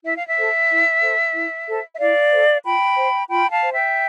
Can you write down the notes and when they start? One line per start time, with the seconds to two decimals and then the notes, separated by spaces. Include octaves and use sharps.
0.04 E4 E5
0.15 F5
0.27 E5
0.37 A4 C5
0.70 E4
1.02 A4 C5
1.34 E4
1.67 A4 C5
1.95 E5
1.99 E4 D5 F5
2.31 A4 C5
2.64 F4 G5 B5
2.97 C5
3.29 F4 G5 B5
3.51 F5 A5
3.63 C5
3.73 E5 G5